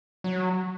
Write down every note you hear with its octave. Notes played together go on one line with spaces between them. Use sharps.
F#3